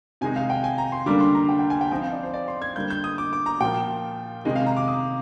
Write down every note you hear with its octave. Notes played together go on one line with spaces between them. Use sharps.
C3 D#3 G#3 D#4 G#5
F5
G5
G#5
A#5
C6
D3 G3 A#3 D4 D6
C6
A#5
G5
G5
G#5
G5
F3 C4 D#4 G5
F5
D5
C5
D5
C6
G#6
D3 G3 A#3 G6
G6
D#6
D6
D6
A#5
A#2 F3 A#3 F4 G5
C3 D#3 G#3 D#5
F5
A#5
D6
D#6